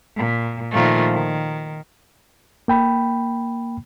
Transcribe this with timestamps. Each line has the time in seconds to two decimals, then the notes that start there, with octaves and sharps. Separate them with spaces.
0.16 A#2
0.71 A#2 D#3 F3 A3
1.12 D#3
2.68 A#3 G5 B5